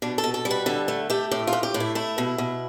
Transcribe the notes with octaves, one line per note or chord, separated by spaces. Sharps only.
B2 D4
A4
B2
A4
G3
B4
D3 A4
A3
A3 G4
A2 G4
F4
A2
G4
A2
E4
A3 E4
B2
B2